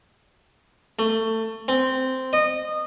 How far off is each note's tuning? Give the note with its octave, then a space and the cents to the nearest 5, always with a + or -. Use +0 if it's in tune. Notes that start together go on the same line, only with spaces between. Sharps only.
A3 +20
C4 -10
D#5 -20